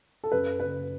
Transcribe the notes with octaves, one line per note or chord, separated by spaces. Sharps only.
A4
F#2 B4
F#1 B4